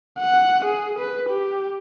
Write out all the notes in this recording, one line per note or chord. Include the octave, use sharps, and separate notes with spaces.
F#5
G#4
B4
G4